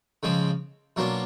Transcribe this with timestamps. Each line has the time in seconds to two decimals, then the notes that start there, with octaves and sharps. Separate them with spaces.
0.23 C#3 F3 G#3 C4
0.96 B2 F#3 A#3 D4 F4